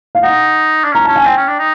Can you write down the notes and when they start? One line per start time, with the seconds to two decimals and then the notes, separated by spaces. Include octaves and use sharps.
0.15 F5
0.23 D#4 F#5
0.84 D4
0.92 C#4 A#5
1.05 C#4 A5
1.16 G#5
1.26 C4 G5
1.38 C#4
1.48 D4
1.59 D#4